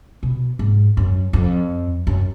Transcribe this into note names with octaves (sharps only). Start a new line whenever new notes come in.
B2
G#2
F#2
F2
F#2